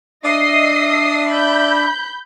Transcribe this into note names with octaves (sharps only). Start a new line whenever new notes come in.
D4 D#5 E5 D#6 C7
B5 G6